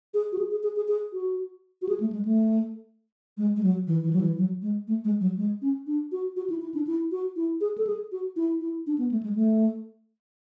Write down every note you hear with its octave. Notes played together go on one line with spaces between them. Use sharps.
G#4
F#4
G#4
G#4
G#4
G#4
G#4
F#4
F#4
G#4
A3
G#3
A3
G#3
G#3
F#3
E3
E3
F#3
E3
F#3
G#3
A3
G#3
F#3
G#3
C#4
D4
F#4
F#4
E4
E4
D4
E4
F#4
E4
G#4
A4
G#4
F#4
E4
E4
D4
B3
A3
G#3
A3